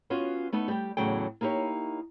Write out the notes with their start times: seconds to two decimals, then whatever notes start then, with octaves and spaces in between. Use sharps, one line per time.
0.10 B3 C#4 F4 F#4
0.53 A3 B3 D#4
0.68 G3 G4
0.97 E2 A2 C#3 F#3 G5
1.41 A#3 D#4 E4 G4 C#5